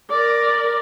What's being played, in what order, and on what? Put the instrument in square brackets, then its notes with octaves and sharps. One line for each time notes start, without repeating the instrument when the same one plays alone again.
[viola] A#4 D5